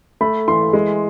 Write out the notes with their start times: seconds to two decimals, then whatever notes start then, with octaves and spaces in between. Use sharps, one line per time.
0.21 A3 B5
0.48 E3 C6
0.73 G#3